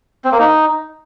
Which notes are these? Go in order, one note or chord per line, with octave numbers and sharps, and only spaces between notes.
C4
A#3
D#4